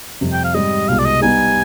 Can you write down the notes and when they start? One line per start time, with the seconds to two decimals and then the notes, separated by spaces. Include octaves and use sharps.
0.21 F2 C3 G3
0.33 G5
0.44 F5
0.54 G#2 G3 C4 G4 D#5
0.88 C2 B2 G#3 F5
0.99 D5
1.05 D#5
1.22 G3 B3 D#4 G4 G#5